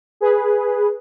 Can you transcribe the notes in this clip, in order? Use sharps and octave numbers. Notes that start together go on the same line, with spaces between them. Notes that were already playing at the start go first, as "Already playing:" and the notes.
G#4 B4